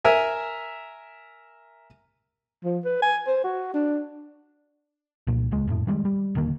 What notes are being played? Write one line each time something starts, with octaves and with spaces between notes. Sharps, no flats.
A#4 E5 G#5
F3
B4
G#5
C5
F#4
D4
C2 A#2
D#1 C#2 G#3
D#1 F2 A2
D#3 E3 G3 G#3
G3
D#1 D3 D#3 A#3